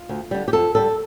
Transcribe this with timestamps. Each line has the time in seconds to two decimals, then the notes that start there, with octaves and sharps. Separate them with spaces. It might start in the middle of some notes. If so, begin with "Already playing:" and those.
Already playing: F4
0.09 D2
0.31 D3 G3
0.48 G4
0.53 F2 A4
0.75 D3 G3 A4